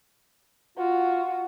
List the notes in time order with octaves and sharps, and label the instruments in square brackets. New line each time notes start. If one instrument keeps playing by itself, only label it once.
[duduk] F4 [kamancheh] F#4